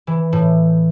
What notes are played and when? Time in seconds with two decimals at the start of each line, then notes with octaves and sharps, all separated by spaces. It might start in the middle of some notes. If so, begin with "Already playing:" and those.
0.07 E3
0.32 A2